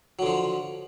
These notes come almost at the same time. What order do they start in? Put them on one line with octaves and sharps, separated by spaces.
F#3 D3 F3